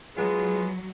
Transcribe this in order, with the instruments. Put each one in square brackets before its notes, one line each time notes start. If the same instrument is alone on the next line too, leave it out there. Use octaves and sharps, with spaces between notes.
[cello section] F#3 [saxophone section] G#3 B3 F4 [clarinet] G#4